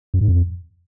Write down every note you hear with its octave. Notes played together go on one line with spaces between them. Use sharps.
F#2
G#2
F2